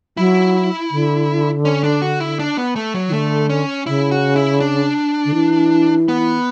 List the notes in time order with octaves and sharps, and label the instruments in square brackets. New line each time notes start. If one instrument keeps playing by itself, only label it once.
[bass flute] F#3 [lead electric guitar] E4
[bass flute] D3
[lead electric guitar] C#4
D4
F#4
E4
D4
B3
A3
F#3
[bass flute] E3
[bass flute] D3 [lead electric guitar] A3
[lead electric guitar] C#4
[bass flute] C#3 [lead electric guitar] E4
[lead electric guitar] F#4
E4
D4
[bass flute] D3
E3
[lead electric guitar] B3